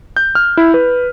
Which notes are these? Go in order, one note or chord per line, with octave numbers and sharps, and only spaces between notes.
G6
F6
E4
B4